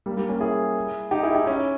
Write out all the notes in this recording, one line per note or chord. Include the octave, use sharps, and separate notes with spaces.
G3 A#3
G3 A#3
A#3 C#4
E4 G#4
D#4 G4
E4 G#4
D#4 G4
C#4 E4